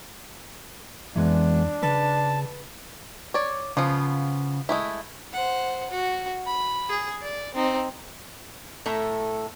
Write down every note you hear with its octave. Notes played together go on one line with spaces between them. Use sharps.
F2 E3 G#3 B3 D4
C#3 B4 A5
C#5 D5
C#3 F3 B3 F4
G#3 A3 E4
C5 F#5
F#4
B5
G#4
D5
C4 D#4
A2 A3 A4 E5 A#5